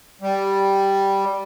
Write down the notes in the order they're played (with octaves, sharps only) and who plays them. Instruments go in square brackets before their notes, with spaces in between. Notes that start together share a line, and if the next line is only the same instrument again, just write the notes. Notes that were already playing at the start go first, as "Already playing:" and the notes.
[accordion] G3